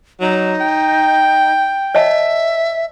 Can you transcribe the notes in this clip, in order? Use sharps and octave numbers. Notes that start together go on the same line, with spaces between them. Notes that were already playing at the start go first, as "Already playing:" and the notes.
F#3 D#4
G5
C#5 D#5 E5 A5